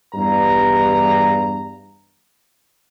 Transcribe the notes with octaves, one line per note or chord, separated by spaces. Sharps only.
E2 G2 A#5